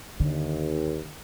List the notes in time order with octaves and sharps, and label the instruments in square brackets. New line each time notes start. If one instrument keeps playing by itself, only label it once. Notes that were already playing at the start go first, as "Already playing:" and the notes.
[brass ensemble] D#2 [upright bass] D3